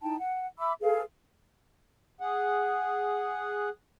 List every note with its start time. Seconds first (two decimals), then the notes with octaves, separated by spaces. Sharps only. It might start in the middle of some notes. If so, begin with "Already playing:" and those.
0.01 D#4 E4 G5 A5
0.19 F#5
0.58 E5 B5 D6 E6
0.81 G#4 A4 B4 F5
2.20 G#4 F#5